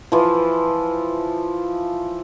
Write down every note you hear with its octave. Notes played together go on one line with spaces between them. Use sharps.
E3 F3